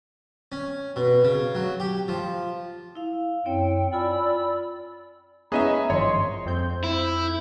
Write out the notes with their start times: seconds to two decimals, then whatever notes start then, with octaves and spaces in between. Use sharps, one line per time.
0.52 C#4
0.96 B2
1.24 C#3
1.55 F#3
1.80 G4
2.08 F3
2.95 E4 F5
3.46 F#2 C4 E4 C#5 G5
3.93 F4 D5 G#5 B5 E6
5.52 B3 C#4 G#4 D#5 E5 A#5
5.90 G#1 G2 F3 C#5 C6
6.46 F2 C4 G6
6.84 E4